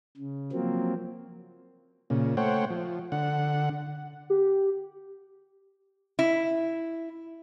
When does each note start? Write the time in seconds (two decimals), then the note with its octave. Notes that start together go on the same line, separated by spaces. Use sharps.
0.17 C#3
0.52 F3 F#3 A#3 C4
2.10 A#2 C#3
2.37 A3 C5 C#5 F#5 G5
2.70 F3
3.12 D3 F#5
4.30 G4
6.19 E4